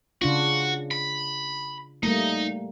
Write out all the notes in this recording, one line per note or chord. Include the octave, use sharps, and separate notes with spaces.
C#3 D4 F4 F#4
B5
G3 A3 A#3 D#4